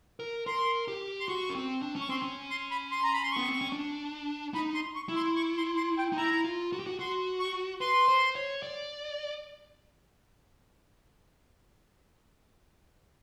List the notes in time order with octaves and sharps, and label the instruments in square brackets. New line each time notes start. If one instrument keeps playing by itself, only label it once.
[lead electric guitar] A#4
[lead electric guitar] A#4 [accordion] C6
[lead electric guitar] G4
[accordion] C6
[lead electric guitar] F#4 [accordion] C#6
[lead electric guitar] C#4
C4
D4
C#4
[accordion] C#6
[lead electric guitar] C4 [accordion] C6
[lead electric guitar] C#4
[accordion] C6
B5
C6
A#5
B5
C6
[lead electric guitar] B3 [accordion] C#6
[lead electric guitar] C4
C#4
D4
[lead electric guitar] D#4 [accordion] B5
[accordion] C6
C#6
[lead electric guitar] E4
[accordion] C6
C#6
C6
C6
G5
[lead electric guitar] D#4
[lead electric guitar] E4 [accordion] A#5
[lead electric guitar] F4
F#4
G4
F#4
[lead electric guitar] F#4 [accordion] C6
[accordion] C#6
[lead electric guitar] B4 [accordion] C6
[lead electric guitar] C5
C#5
D5